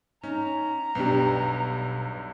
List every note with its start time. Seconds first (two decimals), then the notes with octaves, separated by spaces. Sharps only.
0.23 C#4 D#4 A#5
0.95 B1 G2 B2 D4 G4